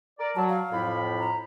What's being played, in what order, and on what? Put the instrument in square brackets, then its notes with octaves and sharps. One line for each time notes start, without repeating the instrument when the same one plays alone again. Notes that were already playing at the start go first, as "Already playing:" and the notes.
[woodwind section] A#4 D5
[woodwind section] F#3 [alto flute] A5
[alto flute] F5
[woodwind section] F2 A2 B5
[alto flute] A#5